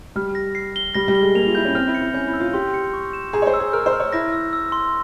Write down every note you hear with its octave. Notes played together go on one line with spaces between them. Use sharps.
G3 F6
A#6
C7
G7
G3 A#6
G3
G7
G#3
A#3 F7
F4
E4 G6
C#4
C4 F6
E4
C#7
E4
C#4 G6
E4
E6
F4
G4 C6
C#7
C#6
E7
G#4 A#5
C#5
C5
E6
G#4
A#4 F6
C5
F6
C#5
E4 A#6
E6
E6
C6